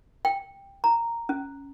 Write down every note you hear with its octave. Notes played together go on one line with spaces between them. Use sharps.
G5
A#5
C#4